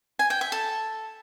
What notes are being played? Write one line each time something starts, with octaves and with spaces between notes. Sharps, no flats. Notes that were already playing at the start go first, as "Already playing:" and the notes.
G#5
G5
E5
A4